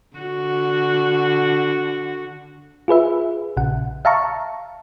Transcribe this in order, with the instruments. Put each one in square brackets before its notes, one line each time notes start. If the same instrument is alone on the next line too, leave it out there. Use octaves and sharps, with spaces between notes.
[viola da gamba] D3 F#4
[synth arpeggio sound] F4 G#4 B4 E5
A#1 C#3 F#5
E5 F5 A5 A#5 C#6